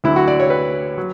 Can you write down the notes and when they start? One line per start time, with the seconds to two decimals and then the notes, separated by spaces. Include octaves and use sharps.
0.04 D2 D3 F#3 E4
0.16 F#4
0.27 D5
0.40 C#5
0.50 B4
0.98 F#3